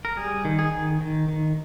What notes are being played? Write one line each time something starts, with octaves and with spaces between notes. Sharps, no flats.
A#4
G3 G#4
D#3
G#4
D#3
D#3
D#3